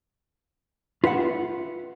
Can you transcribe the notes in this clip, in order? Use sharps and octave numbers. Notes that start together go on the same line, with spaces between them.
F4 B4 E5 F#5